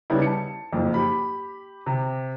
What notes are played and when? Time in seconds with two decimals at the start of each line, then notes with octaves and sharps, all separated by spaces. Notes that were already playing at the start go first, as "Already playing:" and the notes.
0.10 C#3 G3 B3 C#4 D#4 E4
0.22 A5 C#7
0.72 F#1 F2 G#2
0.94 G4 B5
1.86 C3